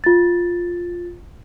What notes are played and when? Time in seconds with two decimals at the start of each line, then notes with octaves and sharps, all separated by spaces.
0.04 F4 A6